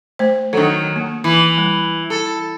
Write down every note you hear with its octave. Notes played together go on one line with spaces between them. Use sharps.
A3 C5
D#3 F#3 D4 A4
A#3
E3
G3
A4